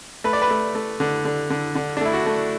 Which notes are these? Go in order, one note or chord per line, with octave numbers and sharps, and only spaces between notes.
A3 B4
D5
B4
A3
A3
D3
D3
D3
D3
D4
A3 E4
F#4
A3